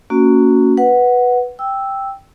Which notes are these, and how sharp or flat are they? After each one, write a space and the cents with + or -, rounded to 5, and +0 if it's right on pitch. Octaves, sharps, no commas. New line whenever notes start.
A#3 -20 C#4 +15 F#4 -10
B4 +0 F#5 +0
G5 +0 E6 +0